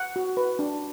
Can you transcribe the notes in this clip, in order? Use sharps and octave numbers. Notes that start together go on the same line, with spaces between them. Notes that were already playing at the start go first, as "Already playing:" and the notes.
Already playing: F#5
F#4
B4
D4